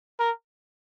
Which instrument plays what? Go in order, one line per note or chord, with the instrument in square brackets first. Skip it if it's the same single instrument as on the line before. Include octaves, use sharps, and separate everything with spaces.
[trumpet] A#4